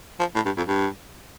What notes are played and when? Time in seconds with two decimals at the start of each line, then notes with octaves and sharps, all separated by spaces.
0.19 F3
0.35 A2
0.45 G2
0.57 F2
0.68 G2